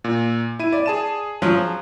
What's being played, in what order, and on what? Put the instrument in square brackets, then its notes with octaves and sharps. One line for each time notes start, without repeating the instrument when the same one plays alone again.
[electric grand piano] A#2
E4 D#7
[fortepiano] D5
[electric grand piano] G#4 A5 E7
[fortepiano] F3 F#3